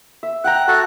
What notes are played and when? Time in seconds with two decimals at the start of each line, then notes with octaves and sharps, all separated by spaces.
0.23 E5
0.44 F#5 G5 A#5 F#6
0.68 F#4 A4 E5 F#6